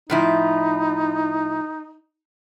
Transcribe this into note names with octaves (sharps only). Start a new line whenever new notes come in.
A2 F3 D#4 E4